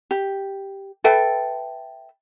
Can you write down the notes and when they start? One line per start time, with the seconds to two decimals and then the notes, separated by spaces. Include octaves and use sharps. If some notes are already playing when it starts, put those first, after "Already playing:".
0.11 G4
1.04 A4 B4 E5 G5